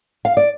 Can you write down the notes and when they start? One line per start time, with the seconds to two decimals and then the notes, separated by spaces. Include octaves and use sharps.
0.25 F5
0.37 D5